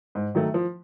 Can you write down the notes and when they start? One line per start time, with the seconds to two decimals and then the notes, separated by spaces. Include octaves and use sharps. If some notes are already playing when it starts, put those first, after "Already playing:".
0.15 G#2
0.35 D#3 F#3 A3
0.54 F3